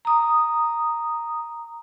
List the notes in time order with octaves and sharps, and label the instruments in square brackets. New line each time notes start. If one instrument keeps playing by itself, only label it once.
[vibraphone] A#5 D#6